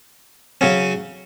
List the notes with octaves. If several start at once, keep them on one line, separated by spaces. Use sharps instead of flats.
C#3 F#3 C#4